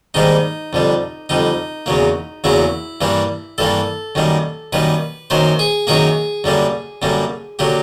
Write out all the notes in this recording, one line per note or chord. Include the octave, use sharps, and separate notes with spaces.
G#2 D#3 G3 A#3 D#4
F2 D3 G3
F2 D3 G3 D#4
E2 C#3 F#3 A#3
E2 C#3 F#3 A#3 E4
G2 E3 G3 A#3
G2 E3 G3 A#3 A4
F#2 D#3 G3 A#3
F#2 D#3 G3 A#3 B4
F#2 D#3 F#3 A#3 C5
G#4
F#2 D#3 F#3 A#3 G#4
F#2 D3 G3 A#3
F#2 D3 G3 A#3
D3 F#3 A#3 G4